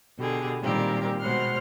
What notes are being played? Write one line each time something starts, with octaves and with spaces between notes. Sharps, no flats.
B2 D3 G4 G#4
A#2 D#3 G3 C4 G4 A#4
B2 G#3 C5 F#5 C6 F6